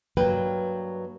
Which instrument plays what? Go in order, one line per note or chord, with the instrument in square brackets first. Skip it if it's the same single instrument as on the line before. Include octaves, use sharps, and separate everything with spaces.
[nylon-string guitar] G2 F#3 A#3 B4 G5